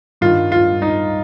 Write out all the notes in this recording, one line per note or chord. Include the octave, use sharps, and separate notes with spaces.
G2 D#3 F4
F4
D#4